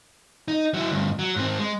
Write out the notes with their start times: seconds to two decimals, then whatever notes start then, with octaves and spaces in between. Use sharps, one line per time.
0.48 D#4
0.74 F#3 E4
0.91 D2 G2
1.19 F#3
1.36 G#2 C4
1.59 G#3